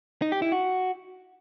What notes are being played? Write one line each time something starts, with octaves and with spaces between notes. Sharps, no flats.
D#4
G4
E4
F#4